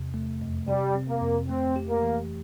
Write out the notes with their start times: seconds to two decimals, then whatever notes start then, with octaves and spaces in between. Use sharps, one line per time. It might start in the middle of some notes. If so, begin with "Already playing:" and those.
Already playing: E2 C3
0.14 A3
0.41 F2
0.68 C3 G3
0.95 C4
1.08 A#3
1.21 F2
1.48 A3 C4
1.76 G4
1.89 A#3
2.02 E3